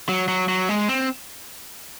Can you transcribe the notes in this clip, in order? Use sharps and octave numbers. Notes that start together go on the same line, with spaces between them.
F#3
F#3
F#3
G#3
C4